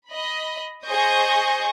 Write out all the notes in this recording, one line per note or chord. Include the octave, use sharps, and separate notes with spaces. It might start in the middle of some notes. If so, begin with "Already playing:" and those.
D#5 B5
G#4 C5 D#5 C#6 D#6 G6